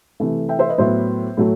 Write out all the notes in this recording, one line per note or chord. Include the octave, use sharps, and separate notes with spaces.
C3 E3 A3
E5 G5
C5 E5
B4 D#5
A2 F#3 B3 C5 E5
A2 F#3 A3